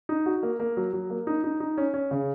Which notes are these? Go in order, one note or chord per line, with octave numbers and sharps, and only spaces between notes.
D#4
F#4
A#3
A#3
F#3
F#3
A#3
D#4
D#4
D#4
C#4
C#4
C#3